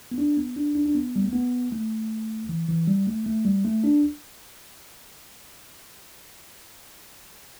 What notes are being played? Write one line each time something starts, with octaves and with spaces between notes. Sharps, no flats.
B3
D4
B3
D4
D4
D4
B3
G3
A3
B3
A3
E3
E3
G3
A3
A3
G3
A3
D4